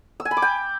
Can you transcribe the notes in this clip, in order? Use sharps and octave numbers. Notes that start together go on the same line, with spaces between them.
E6
G#5
B5
D6
G5